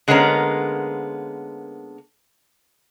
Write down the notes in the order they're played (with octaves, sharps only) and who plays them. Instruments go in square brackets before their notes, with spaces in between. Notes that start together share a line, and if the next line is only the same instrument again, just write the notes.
[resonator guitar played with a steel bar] D3 G#3 A#3 B3 C#4 A#4